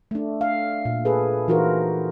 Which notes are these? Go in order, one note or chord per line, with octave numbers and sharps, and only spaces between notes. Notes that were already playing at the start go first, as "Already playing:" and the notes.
A3 D4
F5
A#2
G#4 A4 B4
E3 D#4 F4 F#4 A#4 C5